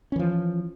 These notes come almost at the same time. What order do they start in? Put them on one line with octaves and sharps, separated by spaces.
C#4 E3 F3